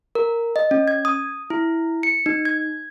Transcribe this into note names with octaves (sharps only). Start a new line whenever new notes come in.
A#4
D#5
C#4
G#6
D#6
E4
C#7
D#4
G#6